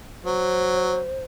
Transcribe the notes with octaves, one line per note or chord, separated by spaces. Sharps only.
F#3 C5